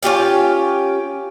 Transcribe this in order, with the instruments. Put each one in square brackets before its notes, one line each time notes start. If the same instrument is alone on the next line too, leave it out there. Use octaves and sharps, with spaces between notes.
[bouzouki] C#4 F4 G4 F5